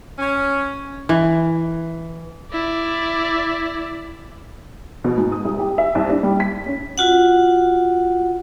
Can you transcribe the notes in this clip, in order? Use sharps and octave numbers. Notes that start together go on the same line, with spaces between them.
C#4
E3
E4 D5
B2
G#2
D#6
C2
G4
E5
C2
D4
G3
B6
C#4
F4 F#4 F#5